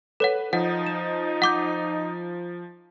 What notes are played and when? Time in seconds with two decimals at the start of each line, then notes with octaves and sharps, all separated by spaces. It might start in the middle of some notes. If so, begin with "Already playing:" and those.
0.20 A4 B4 C#5 F#5
0.53 F3 D#4 F#5
0.86 E7
1.42 F#5 D6 G6